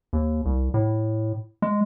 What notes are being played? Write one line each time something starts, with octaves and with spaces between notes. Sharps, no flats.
D#2
C2
A2
G#3